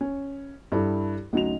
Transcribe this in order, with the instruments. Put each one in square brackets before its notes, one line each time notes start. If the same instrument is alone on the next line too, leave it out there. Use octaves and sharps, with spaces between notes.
[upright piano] C#4
[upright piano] G2 G3 [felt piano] E4 A4
[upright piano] D2 F#3 F7 [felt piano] C#4 D#4